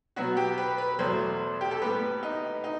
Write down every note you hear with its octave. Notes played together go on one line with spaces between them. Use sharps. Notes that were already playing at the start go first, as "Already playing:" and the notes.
B2 F#3 B3 F#4
G4
B4
B4
E2 B2 F#3 A3 C5
G4
A4
A2 G3 B3 B4
D#4
D#4